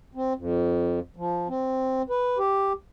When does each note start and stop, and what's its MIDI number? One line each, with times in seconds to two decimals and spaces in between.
0.15 0.33 60
0.36 0.99 41
1.16 1.48 53
1.48 2.02 60
2.10 2.38 71
2.38 2.73 67